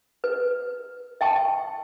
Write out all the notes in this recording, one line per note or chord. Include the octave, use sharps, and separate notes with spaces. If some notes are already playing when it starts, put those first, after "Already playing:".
B4
E5 G5 A5 C#6